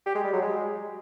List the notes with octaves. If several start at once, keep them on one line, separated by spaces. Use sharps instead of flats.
G4
G#3
G3
F#3
G#3